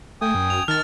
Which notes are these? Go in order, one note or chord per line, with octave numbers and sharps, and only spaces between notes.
A3 G5 G#5 D#6
F#2
F7
D#3 A5 F6 A6